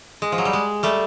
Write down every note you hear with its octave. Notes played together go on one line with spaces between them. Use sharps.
G#3
F3
F#3
G3
G#3
G3 A3